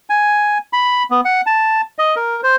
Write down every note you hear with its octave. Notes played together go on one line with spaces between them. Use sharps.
G#5
B5
B3
F#5
A5
D#5
A#4
C5